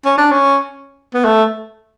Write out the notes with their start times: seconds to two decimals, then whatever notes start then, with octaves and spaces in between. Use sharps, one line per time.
0.05 C#4
0.18 D4
0.32 C#4
1.14 B3
1.25 A3